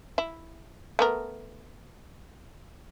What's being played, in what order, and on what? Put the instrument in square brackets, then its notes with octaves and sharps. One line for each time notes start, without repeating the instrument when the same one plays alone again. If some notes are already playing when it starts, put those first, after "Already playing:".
[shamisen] E4
A3 B3 A#4